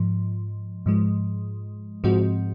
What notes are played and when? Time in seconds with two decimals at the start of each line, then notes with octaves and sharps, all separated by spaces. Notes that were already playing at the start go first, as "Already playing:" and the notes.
Already playing: G#2 F3
0.86 G#2 F3 G#3
2.04 G#2 F3 G#3 C4 F#4